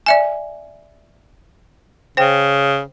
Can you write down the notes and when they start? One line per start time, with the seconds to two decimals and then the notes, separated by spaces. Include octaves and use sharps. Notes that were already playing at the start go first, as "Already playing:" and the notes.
0.06 D5 E5 G#5
2.17 C#3 C5 G5